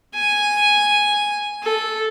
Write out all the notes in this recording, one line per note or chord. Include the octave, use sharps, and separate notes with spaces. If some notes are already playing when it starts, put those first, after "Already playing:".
G#5
A4